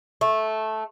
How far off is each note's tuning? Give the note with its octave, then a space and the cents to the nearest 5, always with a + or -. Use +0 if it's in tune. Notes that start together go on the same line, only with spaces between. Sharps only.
A3 -10